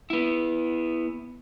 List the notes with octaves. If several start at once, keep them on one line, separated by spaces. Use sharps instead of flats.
B3 E4